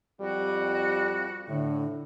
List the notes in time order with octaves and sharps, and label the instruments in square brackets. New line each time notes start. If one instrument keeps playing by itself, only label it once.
[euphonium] F2 [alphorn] G3 [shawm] F#4
[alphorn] A2 [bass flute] D3 [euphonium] E4